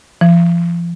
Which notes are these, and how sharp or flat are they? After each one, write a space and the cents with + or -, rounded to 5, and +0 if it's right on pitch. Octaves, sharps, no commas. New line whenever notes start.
F3 -35